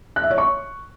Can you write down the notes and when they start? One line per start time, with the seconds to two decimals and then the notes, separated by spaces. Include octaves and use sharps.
0.16 F#6
0.23 E5
0.31 C#5
0.38 C#6